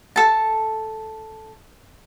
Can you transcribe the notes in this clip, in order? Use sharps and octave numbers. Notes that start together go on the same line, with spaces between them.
A4 A5